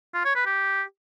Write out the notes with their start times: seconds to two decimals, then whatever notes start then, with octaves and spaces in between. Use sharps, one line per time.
0.14 F4
0.25 C#5
0.35 B4
0.46 G4